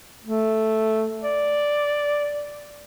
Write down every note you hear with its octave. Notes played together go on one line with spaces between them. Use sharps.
A3
D5